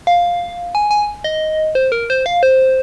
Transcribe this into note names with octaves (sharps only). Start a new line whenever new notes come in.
F5
G#5
G#5
D#5
C5
A#4
C5
F5
C5